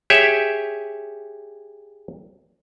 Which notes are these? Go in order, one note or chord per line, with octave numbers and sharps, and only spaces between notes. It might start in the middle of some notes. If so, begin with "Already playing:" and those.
G4 G#4 C#5 E5